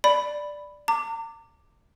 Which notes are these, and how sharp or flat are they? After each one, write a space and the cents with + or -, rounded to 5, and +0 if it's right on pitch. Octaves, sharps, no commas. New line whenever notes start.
D5 +0 B5 +0
A#5 -40 D6 +0